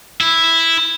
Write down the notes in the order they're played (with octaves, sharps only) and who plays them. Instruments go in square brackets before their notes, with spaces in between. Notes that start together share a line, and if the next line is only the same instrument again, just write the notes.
[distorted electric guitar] E4